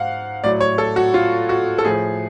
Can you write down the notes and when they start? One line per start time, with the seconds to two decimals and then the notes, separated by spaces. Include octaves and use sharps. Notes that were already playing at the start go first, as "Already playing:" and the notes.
Already playing: G#2 F5 F#5
0.44 A2 F#3 D5
0.61 C#5
0.78 A4
0.96 F#4
1.14 F4
1.49 F#4
1.78 A4
1.85 A2 F3 G#4